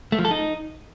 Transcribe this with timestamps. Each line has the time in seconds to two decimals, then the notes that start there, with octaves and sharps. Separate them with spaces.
0.12 A3
0.19 F3
0.25 A4
0.31 D#4